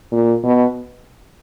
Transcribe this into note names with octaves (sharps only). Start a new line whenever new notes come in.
A#2
B2